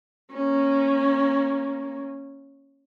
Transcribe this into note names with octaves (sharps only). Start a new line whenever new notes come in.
A#3 C#4